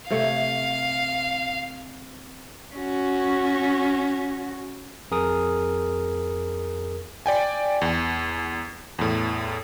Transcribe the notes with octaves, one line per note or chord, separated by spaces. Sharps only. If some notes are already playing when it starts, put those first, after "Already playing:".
C3 A3 C#5 F5
C#4 F#4
F2 G#4 A#4 D#6
D5 G5 G#5
E2
E2 A2